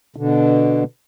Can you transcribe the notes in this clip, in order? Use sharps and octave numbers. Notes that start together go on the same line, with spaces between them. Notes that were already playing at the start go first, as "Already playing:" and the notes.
B2 D3